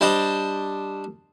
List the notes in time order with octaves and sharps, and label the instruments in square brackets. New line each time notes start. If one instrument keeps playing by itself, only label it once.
[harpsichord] G3 D4 C5 D#5